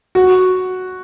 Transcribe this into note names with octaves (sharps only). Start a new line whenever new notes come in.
F#4